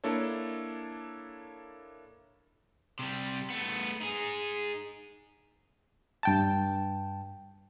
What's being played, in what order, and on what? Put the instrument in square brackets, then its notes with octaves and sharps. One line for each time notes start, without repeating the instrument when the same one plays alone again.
[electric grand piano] A#3 D4 E4 A4 C#5
[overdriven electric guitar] C3 G3
A3 B3
D#4 G#4
[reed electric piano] G2 G5 A5